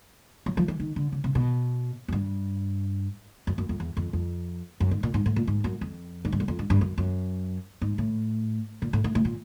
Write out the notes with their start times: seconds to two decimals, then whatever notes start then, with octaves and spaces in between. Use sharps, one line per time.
0.46 F#3
0.57 F3
0.68 E3
0.80 D#3
0.96 D3
1.12 C#3
1.24 C3
1.35 B2
2.08 F#2
2.12 G2
3.47 F#2
3.58 F#2
3.69 F2
3.80 E2
3.97 F2
4.13 F2
4.80 F#2
4.91 G#2
5.03 A#2
5.14 G#2
5.26 A2
5.36 A#2
5.47 G#2
5.64 F#2
5.81 F2
6.25 G#2
6.32 G2
6.40 F#2
6.48 F2
6.59 G2
6.70 G2
6.81 F#2
6.98 F#2
7.82 G#2
7.98 A2
8.82 A#2
8.93 A2
9.04 A2
9.15 A2
9.25 A#2